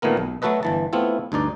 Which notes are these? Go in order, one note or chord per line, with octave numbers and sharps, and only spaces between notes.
A#2 D#3 A3 B3 A#4
B1
F#3 A3 F#4 A4 B4 D#5
G1 E3 A5
A3 B3 C4 E4 F4
D2 G2 D#4 D5